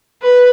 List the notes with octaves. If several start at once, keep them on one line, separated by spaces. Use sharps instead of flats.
B4